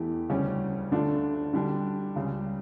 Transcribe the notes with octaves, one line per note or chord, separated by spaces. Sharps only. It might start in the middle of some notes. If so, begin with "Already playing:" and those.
Already playing: E2 E3 A3 E4 G4
D2 C#3 G3 C#4 G4
D2 D3 A3 D4 F4
D3 G3 D4 G4
C#2 C#3 G3